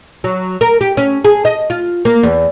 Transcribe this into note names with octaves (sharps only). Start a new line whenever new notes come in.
F#3
A#4
G4
C#4
G#4
D#5
F4
A#3
E2